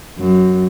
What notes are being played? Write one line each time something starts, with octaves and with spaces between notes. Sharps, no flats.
F#2